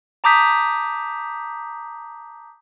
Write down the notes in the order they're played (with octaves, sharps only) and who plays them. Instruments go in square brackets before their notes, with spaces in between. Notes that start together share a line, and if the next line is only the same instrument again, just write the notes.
[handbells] A5 A#5 D6 D#6 G6 B6